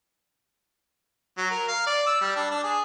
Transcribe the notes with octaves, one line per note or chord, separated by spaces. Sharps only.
F#3
A#4
F5
D5
E6
G3
D4
D4
G#4